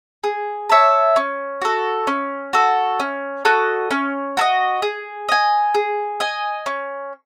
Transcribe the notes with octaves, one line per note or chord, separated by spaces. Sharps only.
G#4
C#5 E5 A5
C#4
F#4 A4
C#4
F#4 A4
C#4
F#4 A4 D#5
C#4
F#4 A4 D#5
G#4
D#5 G#5
G#4
D#5 G#5
C#4